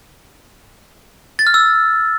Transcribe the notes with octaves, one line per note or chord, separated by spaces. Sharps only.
A6
F6
E6